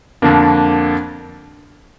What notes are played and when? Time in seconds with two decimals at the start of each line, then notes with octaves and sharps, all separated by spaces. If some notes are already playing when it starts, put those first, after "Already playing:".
0.22 F2 D3 A#3 D4